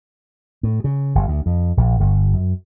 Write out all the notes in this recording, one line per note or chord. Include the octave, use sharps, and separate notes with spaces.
A2
C#3
G1
D2
F2
A#1
G1
F#2